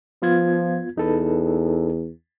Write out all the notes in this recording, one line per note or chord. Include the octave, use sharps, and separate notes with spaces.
F3 B3 F4 G#6
E2 D#4 A4 B4